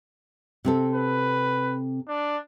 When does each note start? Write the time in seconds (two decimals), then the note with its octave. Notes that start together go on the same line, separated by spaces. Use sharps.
0.65 C3 C4 A4
0.94 B4
2.08 D4